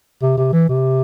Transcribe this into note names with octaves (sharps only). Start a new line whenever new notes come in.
C3
C3
E3
C3